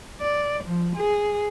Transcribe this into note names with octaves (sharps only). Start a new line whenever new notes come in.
D5
F3
G#4